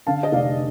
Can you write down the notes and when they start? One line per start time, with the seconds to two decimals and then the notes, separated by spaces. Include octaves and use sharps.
0.07 D3 F5 A5
0.23 D#5
0.32 F1 D5 F5